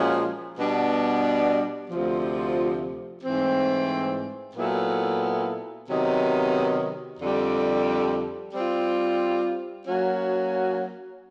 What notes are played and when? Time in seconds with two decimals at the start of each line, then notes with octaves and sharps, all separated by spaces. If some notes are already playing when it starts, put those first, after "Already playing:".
Already playing: A#2 F3 G#3 C#4 F#4
0.57 B2 G3 B3 D4
1.90 D2 C3 F3
3.23 G#2 E3 A3 C4
4.55 A#2 F#3 B3 E4 A4
5.88 C3 D#3 F#3 B3 D#4
7.20 F2 D3 G3
8.53 G3 C4 F4
9.85 F#3 A#3 C#4 F#4